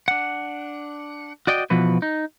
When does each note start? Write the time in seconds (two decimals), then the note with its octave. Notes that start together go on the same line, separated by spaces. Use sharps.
0.08 D4 F#5
1.47 F#4 D5 D#5 G5
1.70 B2 E3 F3 F#4 B4
2.02 D#4